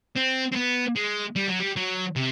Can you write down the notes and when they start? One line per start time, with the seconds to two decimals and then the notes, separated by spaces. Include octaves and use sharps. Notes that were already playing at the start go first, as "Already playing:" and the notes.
0.16 C4
0.52 C4
0.56 B3
0.96 G#3
1.36 G3
1.48 F#3
1.60 G3
1.76 F#3
2.16 C3